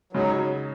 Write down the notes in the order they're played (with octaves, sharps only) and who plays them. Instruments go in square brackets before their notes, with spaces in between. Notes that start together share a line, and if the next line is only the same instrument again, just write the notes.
[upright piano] C#3 G#3 D#4 [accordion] F#3